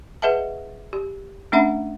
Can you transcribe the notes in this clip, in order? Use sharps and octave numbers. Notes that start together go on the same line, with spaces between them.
G#4 B4 D#5 E5 F#5 A5
G4
A3 C#4 D4 E5 F#5 B5